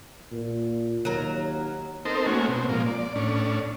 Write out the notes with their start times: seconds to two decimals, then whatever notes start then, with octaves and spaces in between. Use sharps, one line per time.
0.32 A#2
1.05 D#2 F#3 A#4
2.05 C4 D#4 A4 A#4 C5
2.26 A3 A#3 C#4 F#4 G#5
2.48 B2 C4
2.69 A#2 F3 G#3 A#3
2.86 D5
3.16 A2 C#4 D4